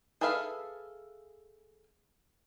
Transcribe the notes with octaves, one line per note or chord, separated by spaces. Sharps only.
G#4 A4 B4 E5 F5